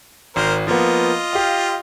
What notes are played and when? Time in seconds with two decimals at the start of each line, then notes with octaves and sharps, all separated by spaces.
0.36 G#1 A#4 C5
0.67 F3 A#3 B3 F4 D#5
1.33 G4 F5